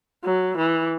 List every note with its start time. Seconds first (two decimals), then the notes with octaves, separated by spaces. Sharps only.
0.24 F#3
0.57 E3